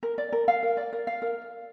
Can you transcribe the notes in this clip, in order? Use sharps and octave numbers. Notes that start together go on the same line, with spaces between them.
A#4
D5
A#4
F5
A#4
D5
A#4
F5
A#4